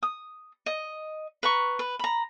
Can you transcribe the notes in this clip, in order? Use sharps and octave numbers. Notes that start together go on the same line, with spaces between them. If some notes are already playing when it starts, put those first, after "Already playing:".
D#6
D#5
B4 A#5 C#6
B4
A#5 B5